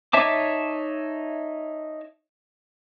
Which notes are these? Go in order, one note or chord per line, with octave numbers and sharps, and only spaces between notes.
D#4 C#5 E5 A5 D6